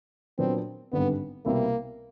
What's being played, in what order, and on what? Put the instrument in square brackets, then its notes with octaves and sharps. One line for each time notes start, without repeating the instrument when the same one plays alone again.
[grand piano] A#2 F#3 B3 D4 [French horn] C4
[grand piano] G#1 G2 D3 G3 [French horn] B3
[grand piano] C2 B2 G3 C4 E4 [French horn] A#3